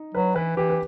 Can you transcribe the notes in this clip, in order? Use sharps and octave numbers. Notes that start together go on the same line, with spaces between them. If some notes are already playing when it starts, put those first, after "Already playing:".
Already playing: D#4
F#3 B4
E3 B4
E3 G4
B4